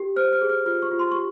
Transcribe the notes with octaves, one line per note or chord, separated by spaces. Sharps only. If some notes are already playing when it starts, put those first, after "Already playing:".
Already playing: G4
C5 F6
F6
G#4
F6
F4 F6
C#6
F4
C6
G4 C#6